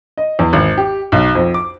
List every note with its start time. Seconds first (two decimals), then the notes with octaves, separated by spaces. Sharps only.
0.18 D#5
0.39 E2
0.53 G#1
0.78 G4
1.12 B1
1.35 F2
1.54 D6